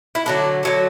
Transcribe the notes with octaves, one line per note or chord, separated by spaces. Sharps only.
E4
D3 F#3 A3 D4
D3 F#3 A3